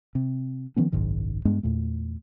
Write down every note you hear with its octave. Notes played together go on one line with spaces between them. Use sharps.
C3
D#3 F3 B3 C#4
F#1 B1 G#2 D#3
G2 G#3 B3 D4
E2 A#2 A3